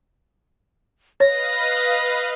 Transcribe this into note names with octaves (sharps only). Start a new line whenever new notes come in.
B4 C#5 D#5 F5 A#6